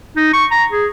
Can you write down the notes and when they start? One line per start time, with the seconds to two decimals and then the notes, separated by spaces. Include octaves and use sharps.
0.16 D#4
0.33 C#6
0.51 A#5
0.71 G#4